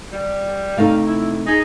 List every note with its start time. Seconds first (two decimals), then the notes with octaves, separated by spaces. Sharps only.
0.12 G3
0.77 C3 G3 A3 D#4 F5
1.06 E4
1.47 D#4 G#4